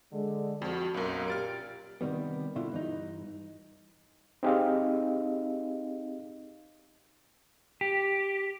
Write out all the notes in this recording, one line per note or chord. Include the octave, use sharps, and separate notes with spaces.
D3 G#3
F2 F3 F#4
B1 F#2 F#3 A#3
A#2 G4 F6 A6 D7
C3 D#3 G3 B3
B2 D3 E4 F4
G2 E3 D#4
C4 D#4 G4 G#4 D#5 F5
G4